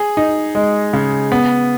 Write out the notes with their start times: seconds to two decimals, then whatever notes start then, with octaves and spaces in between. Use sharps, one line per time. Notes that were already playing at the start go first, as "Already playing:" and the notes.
Already playing: G#4
0.17 D#4
0.55 G#3
0.93 C#3
1.32 B3